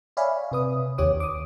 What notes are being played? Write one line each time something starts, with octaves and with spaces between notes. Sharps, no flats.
C#5 D5 E5 F5 G#5 B5
C3 B4 D#6
D#2 D#3 G4 C#5 D6 D#6
D6 D#6